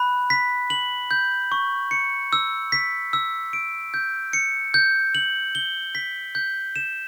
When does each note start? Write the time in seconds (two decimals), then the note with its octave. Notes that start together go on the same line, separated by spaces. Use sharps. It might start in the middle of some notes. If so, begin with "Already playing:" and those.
Already playing: B5 F#6
0.30 B6
0.70 F#7
1.11 G6
1.52 C#6
1.91 C#7
2.33 E6
2.72 B6
3.13 E6
3.53 D7
3.94 G6
4.33 C#7
4.74 G6
5.15 F#7
5.55 G7
5.95 B6
6.35 G6
6.76 E7